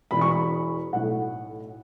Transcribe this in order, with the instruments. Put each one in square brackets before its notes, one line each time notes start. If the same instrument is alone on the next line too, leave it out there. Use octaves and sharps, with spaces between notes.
[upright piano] E1 E2 E3 B5
C#6
B5
B5
B1 A2 A3 F#5